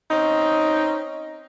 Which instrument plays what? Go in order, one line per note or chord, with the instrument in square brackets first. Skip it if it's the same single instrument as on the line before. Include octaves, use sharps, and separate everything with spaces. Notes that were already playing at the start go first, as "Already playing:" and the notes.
[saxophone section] C4 C#4 D#4